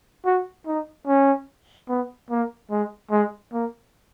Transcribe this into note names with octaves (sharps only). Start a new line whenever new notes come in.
F#4
D#4
C#4
B3
A#3
G#3
G#3
A#3